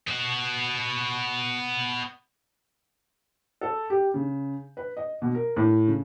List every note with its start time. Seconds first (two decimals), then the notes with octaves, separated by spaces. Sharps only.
0.07 B3 F#4
3.61 A4
3.90 G4
4.14 C#3
4.77 B4
4.97 D#5
5.22 B2
5.35 A#4
5.57 A2
5.87 C#3